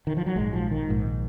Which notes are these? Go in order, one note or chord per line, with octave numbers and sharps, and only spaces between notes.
D#3
F3
F#3
A#1 G#2 G#3
F3
D#3
A#1 G#2